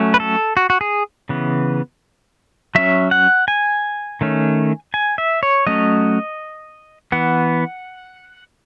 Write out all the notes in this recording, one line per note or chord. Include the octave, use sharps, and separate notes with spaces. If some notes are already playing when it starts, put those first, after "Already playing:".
Already playing: F#3 A3 C#4
B4
A4
F#4
F#4
G#4
C#3 E3 B3
F#3 C#4 E5
F#5
G#5
D#3 A3 C#4
G#5
E5
C#5
F#3 A3 C#4 D#5
E3 B3 F#5